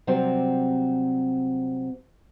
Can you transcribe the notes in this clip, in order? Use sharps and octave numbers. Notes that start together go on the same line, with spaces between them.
C3 F#3 G3 C4 C5 D5